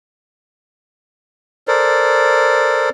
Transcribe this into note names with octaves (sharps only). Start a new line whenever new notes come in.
A4 A#4 C5 D5